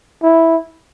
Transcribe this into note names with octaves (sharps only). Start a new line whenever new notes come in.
E4